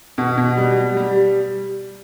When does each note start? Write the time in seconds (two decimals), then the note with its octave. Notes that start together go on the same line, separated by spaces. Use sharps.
0.18 B2
0.37 B2
0.57 G3
0.77 G3
0.97 G3